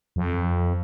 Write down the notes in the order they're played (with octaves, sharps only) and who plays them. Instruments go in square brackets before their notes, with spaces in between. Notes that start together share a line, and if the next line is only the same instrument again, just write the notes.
[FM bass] F2